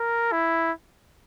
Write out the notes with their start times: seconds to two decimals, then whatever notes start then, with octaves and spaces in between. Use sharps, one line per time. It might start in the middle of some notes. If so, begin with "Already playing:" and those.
Already playing: A#4
0.32 E4